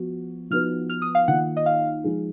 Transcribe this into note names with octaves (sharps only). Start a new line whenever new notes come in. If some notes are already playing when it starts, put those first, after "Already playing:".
Already playing: F3 B3 F#4
F3 B3 D#4 F#4 B4 F6
F6
D#6
F5
D#3 A#3 F4 F#5
D#5
F5
F3 G#3 D#4 G#4